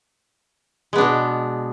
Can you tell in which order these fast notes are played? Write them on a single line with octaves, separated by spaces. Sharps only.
G#3 B3 D4 B2